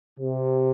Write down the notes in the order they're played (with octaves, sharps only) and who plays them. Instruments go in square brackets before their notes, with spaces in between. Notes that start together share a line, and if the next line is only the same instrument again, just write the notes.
[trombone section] C3